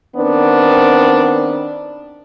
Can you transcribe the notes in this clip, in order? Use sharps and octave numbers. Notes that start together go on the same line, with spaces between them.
D#3 B3 C4 D4